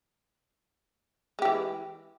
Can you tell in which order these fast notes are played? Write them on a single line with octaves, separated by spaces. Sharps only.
G#3 G4 E3